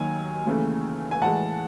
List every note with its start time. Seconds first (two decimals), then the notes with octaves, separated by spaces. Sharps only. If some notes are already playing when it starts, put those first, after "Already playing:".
Already playing: D#2 D#3 F#3 G#5
0.46 D#2 C#3 E3 A3
1.11 G#5
1.22 A2 E3 G#3 F#5 A5